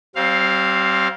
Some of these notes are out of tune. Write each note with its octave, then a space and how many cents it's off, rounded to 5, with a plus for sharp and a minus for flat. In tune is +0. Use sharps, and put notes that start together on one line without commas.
G3 -40 C4 +10 F5 +0